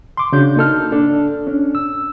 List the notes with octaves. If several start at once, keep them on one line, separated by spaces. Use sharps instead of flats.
C6 D6
C#3 D4 F#4 G6
A#3 D#4 A4 F6
D4 A4
C#4 D4
E6